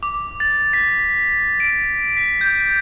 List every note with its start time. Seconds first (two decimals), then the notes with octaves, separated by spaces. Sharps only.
0.03 D6
0.40 A6
0.73 B6
1.60 D7
2.17 B6
2.41 G6